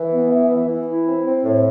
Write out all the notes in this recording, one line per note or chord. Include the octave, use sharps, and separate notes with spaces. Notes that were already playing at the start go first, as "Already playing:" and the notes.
Already playing: E3
B3
E3
E3
E3
E4
C4
C4
A2